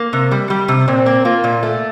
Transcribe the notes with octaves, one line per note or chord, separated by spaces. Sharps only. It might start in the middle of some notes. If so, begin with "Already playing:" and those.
Already playing: A#3
C3
G3
G3
C3
A#2 C4
A#3
A#3 F4
A#2
A3